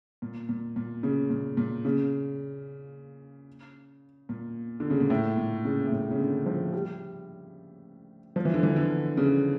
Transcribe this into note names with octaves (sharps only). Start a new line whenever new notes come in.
A#2
A#2
A#2
C#3
A#2
A#2
C#3
A#2
D3
C#3
A#2
A2
A#2
C#3
A2
A#2
C#3
D3
F3
G3
F3
E3
D3
E3
D3
C#3